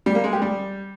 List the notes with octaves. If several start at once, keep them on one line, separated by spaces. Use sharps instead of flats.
G3
A#3
G#3
G4
G3